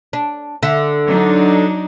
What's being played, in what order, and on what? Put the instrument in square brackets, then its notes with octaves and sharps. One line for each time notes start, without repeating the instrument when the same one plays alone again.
[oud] D4
D3 E5
[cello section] F#3 D4 D#4